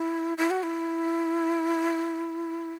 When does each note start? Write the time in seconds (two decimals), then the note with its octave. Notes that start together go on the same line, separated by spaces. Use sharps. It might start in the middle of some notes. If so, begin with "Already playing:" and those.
Already playing: E4
0.38 E4
0.50 F#4
0.63 E4